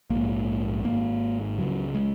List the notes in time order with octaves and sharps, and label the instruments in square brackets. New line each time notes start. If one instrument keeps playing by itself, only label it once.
[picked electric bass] A#1 G#2 A#3
G#1 G#2 A#3
C#2 C#3 F#3
G#3